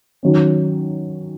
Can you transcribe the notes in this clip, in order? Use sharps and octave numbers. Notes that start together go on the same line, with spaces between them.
D#3 F#3 C#4